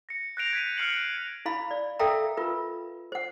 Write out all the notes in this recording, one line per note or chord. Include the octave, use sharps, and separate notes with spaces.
A#6 C#7
F#6 G6 A#6 C7 D7 F7
G#6 B6 D#7
F6 F#6 C7 C#7 F#7
E4 F5 B5
D5
A4 A#4 E5 F5 G5 A#5
F4 A#4 B4
C5 F#5